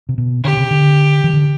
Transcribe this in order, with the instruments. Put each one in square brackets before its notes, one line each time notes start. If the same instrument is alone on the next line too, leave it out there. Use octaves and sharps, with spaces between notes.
[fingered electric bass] C3
B2
[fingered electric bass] D3 [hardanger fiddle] G4
[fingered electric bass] C3
D3
E3
D3